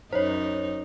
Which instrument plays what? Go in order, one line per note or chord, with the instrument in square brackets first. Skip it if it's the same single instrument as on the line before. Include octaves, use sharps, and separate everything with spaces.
[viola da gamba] F#2 D#4 [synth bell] C5 C#5